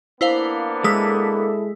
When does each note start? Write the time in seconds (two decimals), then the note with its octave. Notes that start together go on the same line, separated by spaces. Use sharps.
0.21 A#3 B3 D4 E4 C5 F5
0.84 G#3 E4 A4 D#6 E6 B6